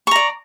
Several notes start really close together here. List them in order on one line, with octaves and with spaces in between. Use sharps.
C#6 A#5 D5